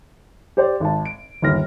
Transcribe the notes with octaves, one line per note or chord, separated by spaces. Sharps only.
G4 C5 D5
G#1 A5
D7
G1 D#2 F6 A#6